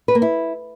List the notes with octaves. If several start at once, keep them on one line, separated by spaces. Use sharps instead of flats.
B4
A#3
E4